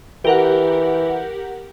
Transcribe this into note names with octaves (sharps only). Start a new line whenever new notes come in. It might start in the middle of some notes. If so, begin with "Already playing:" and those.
E3 G4 A#4 F#5